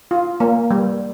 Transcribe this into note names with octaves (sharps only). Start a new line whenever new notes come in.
F4
A#3
G3